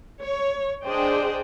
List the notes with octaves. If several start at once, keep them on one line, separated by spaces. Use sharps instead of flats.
C#5
D4 G#4 C5 D5 D#5 G5